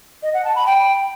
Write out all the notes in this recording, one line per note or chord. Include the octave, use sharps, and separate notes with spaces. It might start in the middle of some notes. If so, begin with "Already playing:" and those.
D#5
F#5
A5
B5
G5